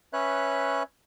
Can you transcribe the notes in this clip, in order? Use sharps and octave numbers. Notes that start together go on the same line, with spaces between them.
C#4 B4 C#5 E5 F#6